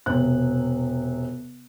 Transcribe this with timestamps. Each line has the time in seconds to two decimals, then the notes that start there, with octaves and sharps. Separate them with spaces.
0.06 E1 C3 F#6